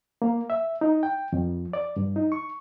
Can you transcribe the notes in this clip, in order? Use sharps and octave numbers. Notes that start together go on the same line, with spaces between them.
A#3
E5
D#4
G5
F2
D5
G2
D#4
C#6